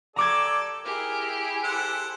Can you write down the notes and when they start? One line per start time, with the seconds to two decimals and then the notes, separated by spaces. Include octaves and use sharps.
0.16 G4 A4 D5 A#5 D6 G#6
0.84 E4 G4 G#4 A#4
1.64 A4 C5 F#5